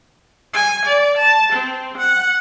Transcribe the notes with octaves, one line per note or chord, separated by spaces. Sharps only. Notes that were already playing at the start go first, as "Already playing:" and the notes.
G#5
D5
A5
C4
F#5